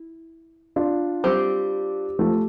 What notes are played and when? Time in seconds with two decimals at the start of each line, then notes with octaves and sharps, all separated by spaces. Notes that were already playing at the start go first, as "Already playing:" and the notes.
Already playing: E4
0.76 D4 F4
1.24 G3 C4 G4
2.19 F3 A3